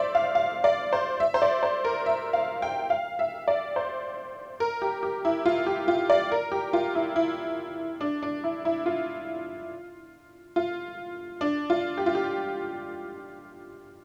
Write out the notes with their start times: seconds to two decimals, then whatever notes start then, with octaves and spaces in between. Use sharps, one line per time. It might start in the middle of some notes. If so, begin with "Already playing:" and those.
Already playing: C5 D5 E5
0.15 F5
0.35 F5
0.64 D5
0.93 C5
1.20 E5
1.34 C5
1.42 D5
1.63 C5
1.85 A#4
2.06 E5
2.33 F5
2.62 G5
2.90 F5
3.19 E5
3.48 D5
3.76 C5
4.60 A#4
4.82 G4
5.03 G4
5.25 E4
5.46 F4
5.67 G4
5.88 F4
6.10 D5
6.32 A#4
6.52 G4
6.73 F4
6.95 E4
7.16 E4
8.01 D4
8.22 D4
8.44 E4
8.65 E4
8.86 F4
10.56 F4
11.41 D4
11.70 F4
11.98 G4
12.06 F4
12.15 G4